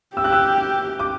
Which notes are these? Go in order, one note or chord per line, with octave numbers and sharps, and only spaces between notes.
G4 E6
F#6
E6
D6